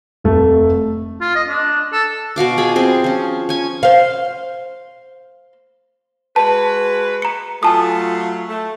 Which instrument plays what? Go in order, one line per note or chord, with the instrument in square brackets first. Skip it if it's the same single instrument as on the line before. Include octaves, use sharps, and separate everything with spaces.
[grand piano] F1 A3
[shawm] F4
D#5
D4
A4
[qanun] B2 F#4 F5 D6
F4 G#4 B5
C4 G#4
F3 C#4
C#4 G#5
[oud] C5 F5
[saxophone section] G#3 F#4 B4 [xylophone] A5
[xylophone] A#5 C#7
[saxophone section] F#3 A3 F4 [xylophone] G#5 A5 D#6
[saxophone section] A3